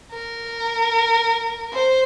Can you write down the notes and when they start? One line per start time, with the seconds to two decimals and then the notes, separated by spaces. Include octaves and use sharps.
0.12 A#4
1.72 C5